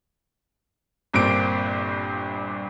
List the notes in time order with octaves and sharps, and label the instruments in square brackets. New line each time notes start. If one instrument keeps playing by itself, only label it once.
[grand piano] G1 G2 A#2 C4 D7